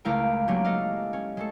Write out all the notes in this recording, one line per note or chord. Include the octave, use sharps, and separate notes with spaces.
C#2 A3 E4 A#4 F5 G5
F#3 A3 A#3 C#4 D4 G4
A4 D#5 F5
C#4
G#3 A3 A4